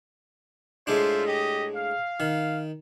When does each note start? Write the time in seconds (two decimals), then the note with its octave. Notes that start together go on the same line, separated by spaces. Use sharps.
0.87 A2 G#3 D4 F4 C5 E5
1.26 G4 D#5
1.76 F5
2.20 D#3